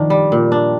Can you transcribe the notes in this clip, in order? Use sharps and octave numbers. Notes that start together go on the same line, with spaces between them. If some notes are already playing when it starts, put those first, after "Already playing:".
Already playing: D#3 F3 D4
G3
A#2
D4